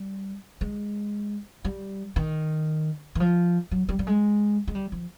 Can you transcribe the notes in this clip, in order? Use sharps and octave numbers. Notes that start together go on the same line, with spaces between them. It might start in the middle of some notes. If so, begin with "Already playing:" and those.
Already playing: G3
G#3
G3
D#3
E3
F3
F#3
G3
G3
G#3
G#3
G3
F3